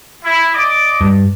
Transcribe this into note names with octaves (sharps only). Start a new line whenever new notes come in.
E4
D5 D#5 D6
G2